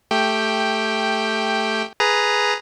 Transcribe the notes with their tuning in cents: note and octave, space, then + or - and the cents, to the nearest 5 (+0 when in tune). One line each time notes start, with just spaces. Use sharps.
A3 +0 G4 +0 G5 +5
G#4 +5 B4 +0 A#5 +0